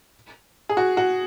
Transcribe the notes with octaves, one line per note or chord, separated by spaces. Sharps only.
G#4
F#4
F#4